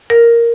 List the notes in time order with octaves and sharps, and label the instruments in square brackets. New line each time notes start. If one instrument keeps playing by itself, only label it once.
[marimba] A#4